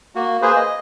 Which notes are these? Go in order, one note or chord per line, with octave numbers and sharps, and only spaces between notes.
A#3 F#4
A#3 G#4 B4 C5
D#5